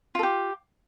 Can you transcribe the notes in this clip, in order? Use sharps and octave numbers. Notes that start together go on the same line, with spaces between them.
F4 G4 A4